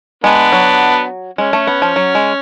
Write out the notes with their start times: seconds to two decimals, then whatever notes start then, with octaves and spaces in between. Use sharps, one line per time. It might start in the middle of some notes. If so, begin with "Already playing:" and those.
0.24 G#3 B3 D4
0.52 F#3
1.38 G#3 C#4
1.53 A3
1.67 B3
1.82 F3
1.96 F#3
2.15 G#3